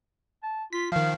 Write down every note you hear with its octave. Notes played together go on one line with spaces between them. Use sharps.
A5
F4 B6
D#3 F3 F5